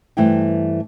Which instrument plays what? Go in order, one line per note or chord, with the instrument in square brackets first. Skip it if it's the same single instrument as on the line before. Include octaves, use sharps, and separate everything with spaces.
[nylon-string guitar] G2 E3 A3 C4 E4 G5